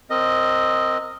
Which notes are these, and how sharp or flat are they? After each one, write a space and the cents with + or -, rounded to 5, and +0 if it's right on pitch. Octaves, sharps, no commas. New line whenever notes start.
C4 +0 A#4 -15 D#5 +0